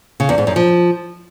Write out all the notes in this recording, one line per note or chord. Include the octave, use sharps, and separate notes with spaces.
C#3
E2
G#2
F#2
F3